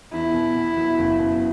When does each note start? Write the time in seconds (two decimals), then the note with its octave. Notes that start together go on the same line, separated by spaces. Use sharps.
0.13 E2 E4
0.34 B2
0.56 B2
0.77 F#3
0.99 F#1
1.20 B2